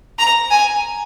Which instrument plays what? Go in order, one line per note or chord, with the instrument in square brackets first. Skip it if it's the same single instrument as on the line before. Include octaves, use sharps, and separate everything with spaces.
[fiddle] A#5
G#5